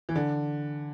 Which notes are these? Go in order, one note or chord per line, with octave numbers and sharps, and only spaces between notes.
E3
D3